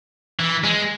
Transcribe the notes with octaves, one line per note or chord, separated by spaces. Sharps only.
E3
G#3